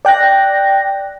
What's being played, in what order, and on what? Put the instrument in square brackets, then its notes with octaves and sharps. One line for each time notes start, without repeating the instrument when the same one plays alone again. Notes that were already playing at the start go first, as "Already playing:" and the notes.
[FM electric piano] D5 G5 F#6 A#6